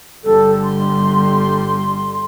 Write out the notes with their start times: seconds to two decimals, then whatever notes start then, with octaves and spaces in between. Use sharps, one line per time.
0.24 G1 D3 G3 A4
0.63 C6